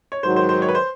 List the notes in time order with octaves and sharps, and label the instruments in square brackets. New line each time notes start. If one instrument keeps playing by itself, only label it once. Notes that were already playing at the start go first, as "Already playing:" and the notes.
[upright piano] C#5
[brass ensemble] G#2 D#3 F#3 [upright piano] C5
[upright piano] C5
C5
C#5
B4
C5